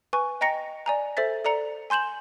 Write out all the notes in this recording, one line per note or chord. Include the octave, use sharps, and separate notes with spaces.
B4 G#5 C#6
D#5 G5 A#5 A#6 C#7
D5 G#5 A#5
A4 C5 E5 A6 B6
A4 D5 A#5 C#7
G#5 C6 G6 E7 F#7